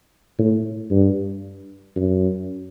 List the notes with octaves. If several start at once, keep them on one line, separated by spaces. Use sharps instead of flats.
A2
G2
F#2